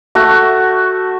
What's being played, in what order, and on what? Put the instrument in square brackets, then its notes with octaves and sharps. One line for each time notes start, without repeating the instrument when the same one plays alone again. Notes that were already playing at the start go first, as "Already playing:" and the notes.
[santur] A3 F#4